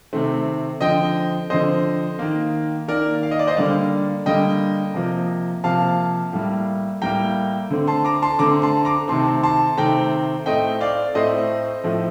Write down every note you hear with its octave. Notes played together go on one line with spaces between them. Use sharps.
C3 D#3 A3 C4
D3 F3 C4 D#5 G5
D3 F3 C4 C5 D#5
D#3 A#3
D#3 A#3 A#4 D5
F5
D#5
D5
C5 D#5
D3 G3 A#3 D5 F5
D3 G3 A#3 D#5 G5
C3 F3 A#3
C3 F3 A#3 F5 A5
A2 G3 A#3
A2 G3 A#3 G5 A#5
D3 A3 C4
A5 C6
A#5 D6
A5 C6
D3 A3 C4 A#5 D6
A5 C6
A#5 D6
C3 D#3 A3 C4 A5 C6
A5 C6
C3 D#3 A3 C4 G5 A#5
A2 A3 C4 D#5 G5
D5 F5
A2 A3 C4 C5 D#5
A2 F3 A3 C4